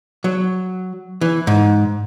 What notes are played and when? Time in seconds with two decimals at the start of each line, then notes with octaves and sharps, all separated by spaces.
0.24 F#3
1.21 E3
1.47 G#2